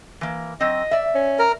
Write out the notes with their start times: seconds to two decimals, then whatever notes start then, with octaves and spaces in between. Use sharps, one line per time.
0.21 E3 A#3
0.60 F#3 C4 D#5
0.91 D5 E5
1.15 C#4
1.39 A#4